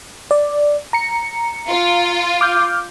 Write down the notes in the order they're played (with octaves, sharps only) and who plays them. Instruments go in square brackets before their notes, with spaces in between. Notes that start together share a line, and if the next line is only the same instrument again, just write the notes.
[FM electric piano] D5
A#5 C#7
[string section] F4
[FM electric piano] D6 F6 G6